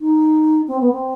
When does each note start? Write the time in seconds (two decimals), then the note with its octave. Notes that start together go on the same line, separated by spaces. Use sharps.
0.01 D#4
0.68 C4
0.80 B3
0.92 C4